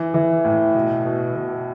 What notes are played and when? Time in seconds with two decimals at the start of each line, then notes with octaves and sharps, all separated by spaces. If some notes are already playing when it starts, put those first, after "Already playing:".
Already playing: E3
0.14 E3
0.44 A2
0.74 B2
1.05 B2
1.35 B2